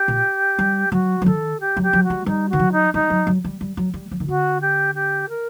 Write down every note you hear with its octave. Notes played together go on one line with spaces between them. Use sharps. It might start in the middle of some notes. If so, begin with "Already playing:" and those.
Already playing: G4
A#2
G3
F#3 F#4
F#3
D#3 A4
G4
F#3
G4
F#3
F#4
G3
G3 D#4
D#3 F#4
F#3
D#4
G3 D#4
F#3
F#3
G3
G3
F#3
G3
F#3
D#3
D3 F#4
G4
G4
A#4